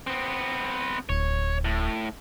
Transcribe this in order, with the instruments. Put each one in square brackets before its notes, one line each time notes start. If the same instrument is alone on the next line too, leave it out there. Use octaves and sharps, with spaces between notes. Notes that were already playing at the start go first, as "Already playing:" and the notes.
[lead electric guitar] B3 C4
[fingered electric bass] D1 [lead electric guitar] C#5
[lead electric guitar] A2